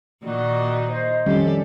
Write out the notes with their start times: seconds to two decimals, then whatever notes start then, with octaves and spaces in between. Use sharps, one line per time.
0.22 A#2 D#3 D#4 F#4 D5
0.87 C5 D#5
1.26 F2 D#3 G3 C#4 G4 A4